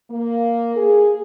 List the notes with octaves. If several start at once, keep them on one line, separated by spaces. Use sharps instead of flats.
A#3
G#4